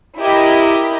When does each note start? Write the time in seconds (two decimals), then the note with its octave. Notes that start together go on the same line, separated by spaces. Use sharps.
0.19 E4 G4 A#4 D#5